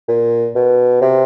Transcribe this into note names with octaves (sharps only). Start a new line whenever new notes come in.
A#2
B2
C3